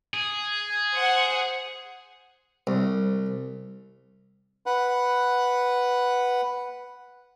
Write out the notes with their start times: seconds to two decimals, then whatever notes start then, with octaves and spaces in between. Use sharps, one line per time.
0.14 G#4
0.93 C5 F#5
2.67 C2
4.66 B4 F#5